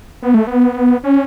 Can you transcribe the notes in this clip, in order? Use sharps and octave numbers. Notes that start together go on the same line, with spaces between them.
B3
A3
B3
C#4